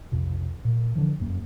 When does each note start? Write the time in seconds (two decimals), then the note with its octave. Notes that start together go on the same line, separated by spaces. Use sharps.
0.12 B1 F2 C3
0.65 A#2
0.95 D3 E3 F3
1.20 F1 F#2 A#3